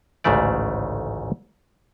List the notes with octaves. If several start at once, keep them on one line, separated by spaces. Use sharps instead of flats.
A1 D2 G#2 C#3 A3 D5